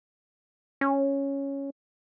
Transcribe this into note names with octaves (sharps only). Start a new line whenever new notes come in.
C#4